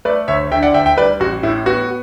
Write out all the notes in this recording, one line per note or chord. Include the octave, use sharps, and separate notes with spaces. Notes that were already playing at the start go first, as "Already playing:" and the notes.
A3 B4 D5
D2 C#5 E5
D3 E5 G5
D5 F#5
D2 E5 G5
E5 G5
G3 B4 D5
A1 F#4
A2 E4
B3 F#4